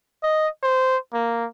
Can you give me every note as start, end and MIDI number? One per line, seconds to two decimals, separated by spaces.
0.23 0.47 75
0.63 0.96 72
1.14 1.46 58